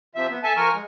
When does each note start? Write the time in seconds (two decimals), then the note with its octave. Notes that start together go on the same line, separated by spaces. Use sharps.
0.15 C3 F3 E5
0.30 B3
0.44 A4 E5 G#5 A5
0.56 F3 A#4 G#5 C#6
0.74 G#3